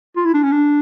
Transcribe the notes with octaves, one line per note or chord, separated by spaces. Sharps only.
F4
E4
D4
C#4
D4